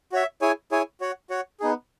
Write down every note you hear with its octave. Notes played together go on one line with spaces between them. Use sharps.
F#4 C#5 E5
E4 G#4 C#5 G#5
E4 G#4 C#5 G#5
F#4 C#5 F#5
F#4 C#5 F#5
B3 D#4 G#4